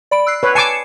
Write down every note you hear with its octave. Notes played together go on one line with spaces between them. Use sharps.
D5 B5 D7
E6 F#6 C7
B4 C#5
G#5 A5 D6 C7 C#7 E7